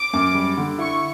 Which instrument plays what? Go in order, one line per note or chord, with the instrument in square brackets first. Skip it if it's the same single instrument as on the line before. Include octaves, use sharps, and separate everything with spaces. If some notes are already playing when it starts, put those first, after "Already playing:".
Already playing: [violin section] D6
[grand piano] F#2
G3
D3
[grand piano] E4 [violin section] C#6